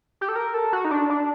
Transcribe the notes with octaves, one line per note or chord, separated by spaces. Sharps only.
G4
A4
A#4
A4
F#4
D#4
D4
D4